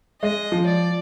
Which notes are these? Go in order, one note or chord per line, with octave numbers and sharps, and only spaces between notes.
G#3 D#5
F3
D5